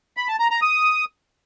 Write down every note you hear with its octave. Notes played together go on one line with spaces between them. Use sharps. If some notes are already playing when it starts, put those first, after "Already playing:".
B5
A5
A#5
A#5
D#6